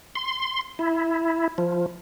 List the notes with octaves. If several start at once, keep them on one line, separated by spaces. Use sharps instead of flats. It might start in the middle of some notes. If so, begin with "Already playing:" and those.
C6
E4
F3